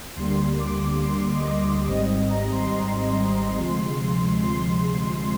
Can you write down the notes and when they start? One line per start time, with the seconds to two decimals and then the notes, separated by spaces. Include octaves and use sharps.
0.16 D2 D3 G3 A#3 C6
0.60 D6
1.02 C6
1.31 D#5
1.58 D#5
1.87 G#1 G#2 G3 C4 D#5
2.29 A#5
2.52 C6
3.58 D2 C3 F3 G#3
4.44 C6